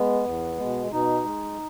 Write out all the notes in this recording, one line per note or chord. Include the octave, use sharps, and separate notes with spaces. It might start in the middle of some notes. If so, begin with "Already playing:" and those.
Already playing: G#3 B3
E2
B2 G#3
B2 D#4
G#3